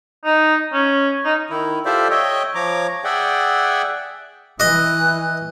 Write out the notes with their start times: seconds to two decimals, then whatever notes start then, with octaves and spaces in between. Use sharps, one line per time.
0.25 D#4
0.73 C#4
1.25 D#4
1.50 D#3 E4
1.85 F4 G4 A4 C5 D5 E5
2.11 C#5 D#5 E5 G5
2.55 F3 C#5 A#5 D6
3.04 G#4 D5 E5 F#5 G5
4.60 E3 D#5 F#6